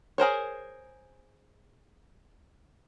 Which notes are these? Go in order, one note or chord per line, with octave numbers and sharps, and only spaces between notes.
G#4 A#4 C5 C#5